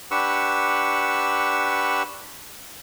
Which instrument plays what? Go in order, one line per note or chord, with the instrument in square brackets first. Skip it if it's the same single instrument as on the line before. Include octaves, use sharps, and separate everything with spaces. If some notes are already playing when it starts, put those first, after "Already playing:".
[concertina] D4 G4 B4 F#5 C#6 E6